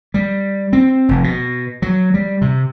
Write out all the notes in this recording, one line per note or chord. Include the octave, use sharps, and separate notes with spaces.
G3
C4
F1
B2
F#3
G3
C3